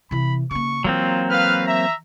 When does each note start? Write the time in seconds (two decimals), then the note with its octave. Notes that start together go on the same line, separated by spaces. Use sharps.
0.11 C3 E3 B5
0.51 C#3 A#3 C#6
0.84 E3 F#3 A#3 C4 F4
1.30 B4 F5 F6
1.66 E5 A#5